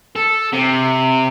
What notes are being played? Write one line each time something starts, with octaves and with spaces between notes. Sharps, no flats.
A4
C3